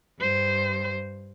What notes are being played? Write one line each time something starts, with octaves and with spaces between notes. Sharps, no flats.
G2 C5